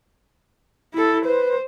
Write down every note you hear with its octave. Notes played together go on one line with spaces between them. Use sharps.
E4 A4
B4 C5